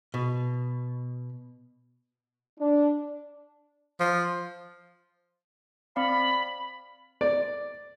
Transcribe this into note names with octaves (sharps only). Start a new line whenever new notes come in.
B2
D4
F3
C4 D5 F5 B5
D5